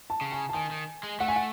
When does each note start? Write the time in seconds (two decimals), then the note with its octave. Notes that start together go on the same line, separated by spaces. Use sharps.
0.10 A5
0.21 C#3
0.32 G#5
0.49 A5
0.54 D#3 G#5
0.71 D#3
1.03 G#3
1.20 A3 F#5
1.28 G#5
1.36 F#5